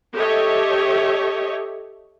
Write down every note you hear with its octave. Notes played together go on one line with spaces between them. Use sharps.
G4 A4 C#5 D#5 E5